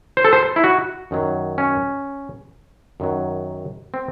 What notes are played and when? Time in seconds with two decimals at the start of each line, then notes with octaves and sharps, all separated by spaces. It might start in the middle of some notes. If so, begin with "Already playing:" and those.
0.17 C5
0.24 A4
0.33 C5
0.56 E4
0.64 F#4
1.11 F#2 D#3 F#3
1.58 C#4
3.00 F#2 D#3 F#3
3.94 C4